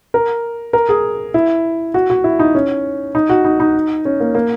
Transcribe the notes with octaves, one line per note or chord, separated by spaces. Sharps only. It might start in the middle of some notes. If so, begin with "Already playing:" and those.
A#4
A#4
G#4
E4
F#4
F#4
E4
D#4
C#4
D#4
F#4
D#4
D#4
C#4
A#3
A#3